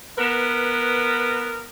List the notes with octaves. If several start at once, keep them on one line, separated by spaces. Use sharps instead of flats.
B3 A#4 B4